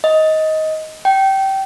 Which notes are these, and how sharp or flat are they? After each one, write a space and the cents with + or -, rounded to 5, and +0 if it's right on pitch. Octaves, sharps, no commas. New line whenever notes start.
D#5 +15
G5 -20